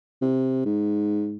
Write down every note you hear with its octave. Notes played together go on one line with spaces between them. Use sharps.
C3
G#2